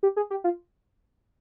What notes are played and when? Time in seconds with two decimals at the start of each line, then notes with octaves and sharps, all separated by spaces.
0.03 G4
0.16 G#4
0.30 G4
0.44 F4